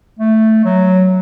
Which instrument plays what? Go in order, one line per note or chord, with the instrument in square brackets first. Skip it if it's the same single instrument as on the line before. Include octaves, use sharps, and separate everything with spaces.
[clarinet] A3
F#3